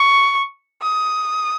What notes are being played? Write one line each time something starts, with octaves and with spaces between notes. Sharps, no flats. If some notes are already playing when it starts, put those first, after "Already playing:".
Already playing: C#6
D#6